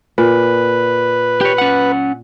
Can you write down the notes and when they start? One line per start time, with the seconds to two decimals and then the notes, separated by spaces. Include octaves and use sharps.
0.18 A#2 B4
1.41 G4 C#5
1.58 C#4 F#5